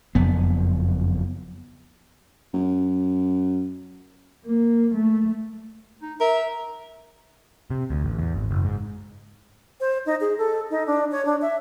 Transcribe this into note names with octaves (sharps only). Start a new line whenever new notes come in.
F#1 F2 B3
F#2
A#3
A3
D#4
A#4 E5
C3
D2
A1
E2
G#1
F#1
G#2
C5
D#4
G#4
A4
D#4
D4
C#5
D4
E5